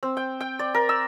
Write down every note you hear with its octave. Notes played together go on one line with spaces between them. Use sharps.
C4
G5
G5
D5
A#4
E6